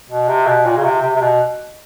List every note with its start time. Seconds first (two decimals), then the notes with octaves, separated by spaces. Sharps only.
0.10 B2
0.29 C3
0.47 B2
0.66 A#2
0.77 C#3
0.85 C3
1.02 C3
1.16 C3
1.21 B2